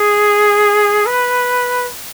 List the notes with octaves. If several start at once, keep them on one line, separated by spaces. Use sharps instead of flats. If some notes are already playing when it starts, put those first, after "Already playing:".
Already playing: G#4
B4